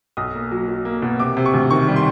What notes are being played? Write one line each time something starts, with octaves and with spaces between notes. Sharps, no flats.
B1 D#6
A#3
F#3
F#3
A#3
B2
C3 D6
C3
C#6
D2
D#3 C#6
G3
C6